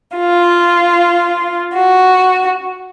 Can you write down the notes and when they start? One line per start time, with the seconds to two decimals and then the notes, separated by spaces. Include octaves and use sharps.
0.16 F4
1.74 F#4